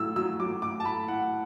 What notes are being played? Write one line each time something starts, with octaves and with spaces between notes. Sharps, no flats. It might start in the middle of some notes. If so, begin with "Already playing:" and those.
Already playing: A2 F#3 E6
F#3 E6
F#3 D6
A2 D6
A5
A2 B5
A2 F#5